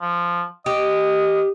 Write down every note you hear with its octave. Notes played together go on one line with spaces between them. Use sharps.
F3
G4 D#5